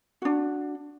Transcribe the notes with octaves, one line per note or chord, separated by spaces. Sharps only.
D4 F#4